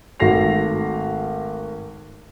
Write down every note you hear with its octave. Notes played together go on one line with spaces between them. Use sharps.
G#1 A3 F#4 A#6 C7 F7